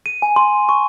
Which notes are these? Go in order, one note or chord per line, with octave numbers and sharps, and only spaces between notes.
D#7
G#5
C6
C#6